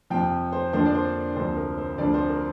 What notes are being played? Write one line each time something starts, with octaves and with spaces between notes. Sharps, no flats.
F2 C3 F3 G5
C5
F2 D3 F3 A#3 D4 C5
D5
C5
D2 C3 F3 C5
A#4
C5
D2 D3 F3 C4 D5
C5
A#4